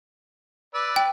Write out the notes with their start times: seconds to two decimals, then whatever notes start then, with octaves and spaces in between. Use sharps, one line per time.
0.74 B4 D5 E6
0.96 G5